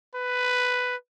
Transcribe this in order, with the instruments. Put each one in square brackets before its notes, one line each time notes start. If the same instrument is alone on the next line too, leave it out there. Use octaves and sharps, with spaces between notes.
[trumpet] B4